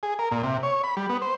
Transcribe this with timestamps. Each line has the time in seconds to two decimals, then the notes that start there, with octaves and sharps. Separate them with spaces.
0.03 G#4
0.19 A#4
0.31 A#2
0.43 C3
0.63 C#5
0.84 B5
0.97 G3
1.09 B3
1.22 C5